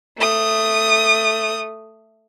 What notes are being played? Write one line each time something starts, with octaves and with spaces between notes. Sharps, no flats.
A3 D#6